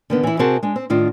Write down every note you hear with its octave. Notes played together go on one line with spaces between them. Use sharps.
D3 D#3 B3
E3 E4
C3 C4 F#4 G#4 A#4 A5
G#3 D4
C4
A2 D#3 D4 F4